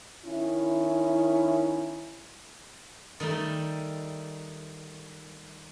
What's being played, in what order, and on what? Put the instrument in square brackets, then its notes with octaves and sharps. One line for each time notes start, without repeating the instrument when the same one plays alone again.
[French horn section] D#3 C#4 E4
[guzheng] D#3 G3 A3 D#4